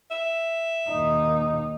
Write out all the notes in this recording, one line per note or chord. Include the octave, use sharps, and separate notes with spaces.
E5
D#2 D#4